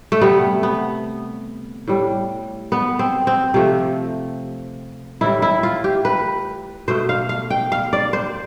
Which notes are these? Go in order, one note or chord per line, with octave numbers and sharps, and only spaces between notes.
A3
C3 G3 B3
B3
A2 G3
B3
C4
C4
C3 F3 A3
A2 E3 G3 E4
E4
F4
G4
B4
B2 A3 C5
F5
F5
G5
F5
D5
C5